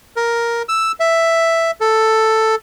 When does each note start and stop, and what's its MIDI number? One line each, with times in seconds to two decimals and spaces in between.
0.16 0.62 70
0.69 0.92 88
1.00 1.71 76
1.81 2.55 69